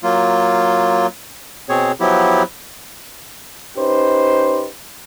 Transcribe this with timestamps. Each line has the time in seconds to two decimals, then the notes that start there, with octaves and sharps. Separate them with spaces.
0.03 F#3 A#3 F4
1.69 B2 C4 G#4 C#5
2.00 F3 F#3 B3 E4 G4
3.77 C#4 D#4 G4 B4 C5